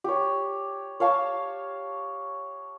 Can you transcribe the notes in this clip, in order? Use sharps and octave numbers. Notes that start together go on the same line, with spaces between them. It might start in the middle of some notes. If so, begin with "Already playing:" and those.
G4 C#5
C#5 F5 A5 C#6